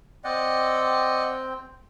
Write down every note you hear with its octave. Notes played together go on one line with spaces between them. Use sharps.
C4 D5 D#5 F#5 G5